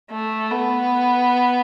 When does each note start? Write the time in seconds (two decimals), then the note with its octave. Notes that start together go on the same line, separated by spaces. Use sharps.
0.11 A3
0.51 B3